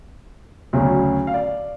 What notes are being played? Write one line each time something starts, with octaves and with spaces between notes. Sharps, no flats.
D2 C#3 F#3 C#4
F5
D5